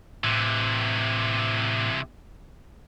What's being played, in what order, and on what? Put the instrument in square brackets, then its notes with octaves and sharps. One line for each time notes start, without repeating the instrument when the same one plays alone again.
[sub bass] A2 [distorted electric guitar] C3 E3